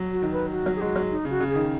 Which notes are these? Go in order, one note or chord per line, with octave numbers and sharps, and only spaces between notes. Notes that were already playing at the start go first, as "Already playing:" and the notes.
Already playing: F#3
F#4
D#3
B4
F#4
F#3
G#4
G#3 F#4
F#3
D#4
C#3 F#4
C#3
G#4
D#3